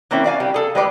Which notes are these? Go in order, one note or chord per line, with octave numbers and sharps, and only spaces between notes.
E3 A#3 C4 C#4 E4
F#4 D5 F5 G#5
G3
G#4 A4
G3 G#3 B4 C5 D5